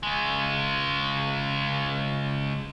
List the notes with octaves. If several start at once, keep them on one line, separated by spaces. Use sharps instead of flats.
C#3 G#3